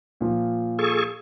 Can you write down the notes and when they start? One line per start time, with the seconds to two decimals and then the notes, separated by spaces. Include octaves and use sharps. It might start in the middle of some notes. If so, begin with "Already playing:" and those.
0.21 A#2 F3
0.79 G#4 A4 C#6